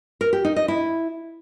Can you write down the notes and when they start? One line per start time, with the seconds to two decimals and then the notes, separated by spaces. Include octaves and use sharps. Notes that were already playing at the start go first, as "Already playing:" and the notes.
0.21 A#4
0.33 G4
0.45 D#4
0.56 D#5
0.68 E4